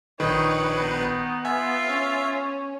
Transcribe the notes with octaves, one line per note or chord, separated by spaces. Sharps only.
A#1 D#3 D#4 B4 C#5
B3 D#4
F4 E5 G#5
C#4